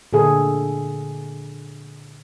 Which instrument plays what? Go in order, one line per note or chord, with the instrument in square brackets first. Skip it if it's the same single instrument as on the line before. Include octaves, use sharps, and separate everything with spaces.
[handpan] A#2 D3 G#4 A4